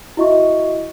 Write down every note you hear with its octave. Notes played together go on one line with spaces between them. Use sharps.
E4 F#4 D#5 E5 C#6